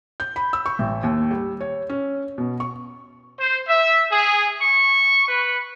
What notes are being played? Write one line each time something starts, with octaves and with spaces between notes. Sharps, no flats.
G6
B5
E6
C#6
A1
D#2
G3
C#5
C#4
B2
C#6
C5
E5
G#4
C#6
B4